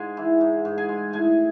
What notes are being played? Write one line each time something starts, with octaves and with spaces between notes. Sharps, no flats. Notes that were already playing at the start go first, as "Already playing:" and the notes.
Already playing: G#2 G#3 G#4 G#5
E3
G#2
G#2
G#4 G#5
G#3
A2 G#4 G#5